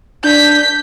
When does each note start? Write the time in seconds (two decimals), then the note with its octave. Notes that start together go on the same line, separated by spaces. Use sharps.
0.24 D4 G6 B6